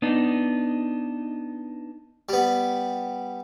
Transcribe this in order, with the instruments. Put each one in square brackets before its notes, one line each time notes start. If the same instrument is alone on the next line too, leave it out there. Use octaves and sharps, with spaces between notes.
[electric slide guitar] B3 D4 D#4
[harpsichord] G3 B3